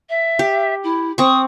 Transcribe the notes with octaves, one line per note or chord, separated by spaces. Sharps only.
E5
G4
E4
C4 C#6 D#6